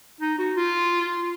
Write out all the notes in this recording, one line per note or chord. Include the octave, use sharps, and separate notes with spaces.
D#4
F#4
F4